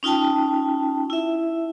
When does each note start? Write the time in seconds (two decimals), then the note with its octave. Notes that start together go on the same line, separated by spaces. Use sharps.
0.03 C#4 D#4 F4 G5 A5
1.10 E4 E5